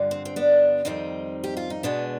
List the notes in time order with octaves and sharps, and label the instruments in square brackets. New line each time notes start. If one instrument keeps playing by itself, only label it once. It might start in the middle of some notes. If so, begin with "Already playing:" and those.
Already playing: [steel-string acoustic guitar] G2 D3 F3
C4
C4
B3 D4
F2 D#3 G3 C4 D#4
G4
F4
D#4
B2 G#3 B3 D4